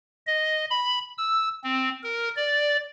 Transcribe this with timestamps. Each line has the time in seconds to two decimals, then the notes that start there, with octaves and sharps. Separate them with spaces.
0.27 D#5
0.70 B5
1.18 E6
1.64 C4
2.04 A#4
2.36 D5